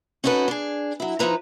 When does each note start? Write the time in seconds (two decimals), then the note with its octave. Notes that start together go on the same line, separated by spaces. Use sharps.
0.24 C#4 D#4 F#4 A4 B4
0.48 D4 G#4
1.00 F#3 E4
1.19 F3 D#4 E4 B4 A#5